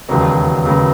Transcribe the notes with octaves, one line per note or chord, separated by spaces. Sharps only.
E1 D#2 C#3 F#3 B3
E1 D#2 C#3 F#3 B3